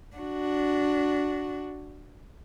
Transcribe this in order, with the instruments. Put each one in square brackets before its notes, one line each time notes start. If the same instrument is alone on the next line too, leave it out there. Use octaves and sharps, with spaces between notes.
[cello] D4 F#4